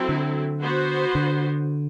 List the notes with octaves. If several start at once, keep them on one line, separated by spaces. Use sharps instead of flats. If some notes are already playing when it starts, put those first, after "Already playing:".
Already playing: F#3 C4 E4 A4
D3
B3 F#4 C5
D3